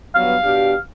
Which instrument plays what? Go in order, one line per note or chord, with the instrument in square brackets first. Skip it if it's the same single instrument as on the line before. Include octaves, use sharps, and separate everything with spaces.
[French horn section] G2 F#3 B3 [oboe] F5
[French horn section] B2 D4 G4